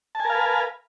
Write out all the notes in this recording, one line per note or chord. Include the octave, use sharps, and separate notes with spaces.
A#4 B4 F5 G#5 A5